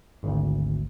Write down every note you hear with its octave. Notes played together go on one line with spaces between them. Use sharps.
G#1 D2